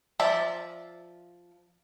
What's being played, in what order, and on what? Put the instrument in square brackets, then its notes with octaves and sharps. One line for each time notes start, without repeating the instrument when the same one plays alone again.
[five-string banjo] F3 D5 E5